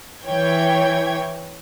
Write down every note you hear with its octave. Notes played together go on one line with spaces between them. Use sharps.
E3 C#5 G5 G#6